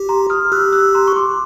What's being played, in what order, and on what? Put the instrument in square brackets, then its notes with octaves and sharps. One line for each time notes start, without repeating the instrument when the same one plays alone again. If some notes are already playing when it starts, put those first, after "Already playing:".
Already playing: [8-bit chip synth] G4
[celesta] A#5 C6
D#6 F6
[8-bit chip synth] G4 [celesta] E6 F#6
[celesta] E6 F#6
A#5 C6
C#6
C6 D6